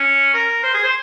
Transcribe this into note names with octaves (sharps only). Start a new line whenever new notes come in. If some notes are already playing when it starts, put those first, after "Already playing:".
Already playing: C#4
A#4
C5
G#4
C5